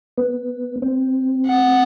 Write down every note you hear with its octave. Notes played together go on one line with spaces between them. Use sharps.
B3
C4
F#5